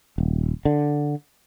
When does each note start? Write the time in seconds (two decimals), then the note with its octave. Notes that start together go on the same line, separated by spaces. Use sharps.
0.18 D#1
0.65 D3